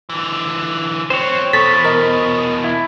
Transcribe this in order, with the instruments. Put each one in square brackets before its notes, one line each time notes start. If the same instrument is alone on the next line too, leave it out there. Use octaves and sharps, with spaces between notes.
[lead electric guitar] D3 E3
[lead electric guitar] F#3 C4 [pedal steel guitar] C5 C#5
[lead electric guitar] E2 B2 [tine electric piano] A4 B6 [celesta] C#6 A6
[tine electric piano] A#4 D#5
[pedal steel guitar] E4